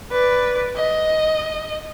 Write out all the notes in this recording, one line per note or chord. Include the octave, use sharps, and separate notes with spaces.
B4 D5
D#5